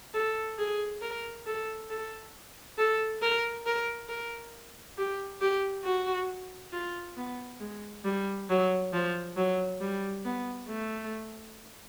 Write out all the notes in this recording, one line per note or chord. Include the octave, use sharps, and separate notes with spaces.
A4
G#4
A#4
A4
A4
A4
A#4
A#4
A#4
G4
G4
F#4
F4
B3
G#3
G3
F#3
F3
F#3
G3
B3
A3